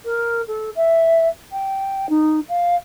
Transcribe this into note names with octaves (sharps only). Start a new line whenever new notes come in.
A#4
A4
E5
G5
D#4
F5